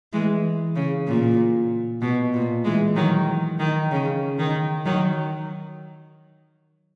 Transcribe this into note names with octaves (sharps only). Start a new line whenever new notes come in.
E3 G#3
C#3
A#2
B2
A#2
E3 G#3
D#3 F#3
D#3
C#3
D#3
D#3 F#3